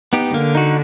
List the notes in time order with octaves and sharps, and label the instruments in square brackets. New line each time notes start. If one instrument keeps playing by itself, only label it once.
[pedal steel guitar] B3 D#4 G4
[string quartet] D3 [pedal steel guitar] A#3
[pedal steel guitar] D#4 F#4